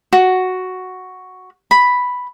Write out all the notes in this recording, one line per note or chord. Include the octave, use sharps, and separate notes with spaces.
F#4
B5